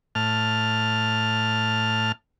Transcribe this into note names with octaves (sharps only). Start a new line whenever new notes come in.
A2 A5 F6